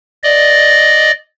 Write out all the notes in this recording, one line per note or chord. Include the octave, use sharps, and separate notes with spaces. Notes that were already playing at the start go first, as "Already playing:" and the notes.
D5 D#5